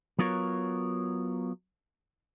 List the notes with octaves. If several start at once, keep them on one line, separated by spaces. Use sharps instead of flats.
F#3 B3 F4 A#4 C#5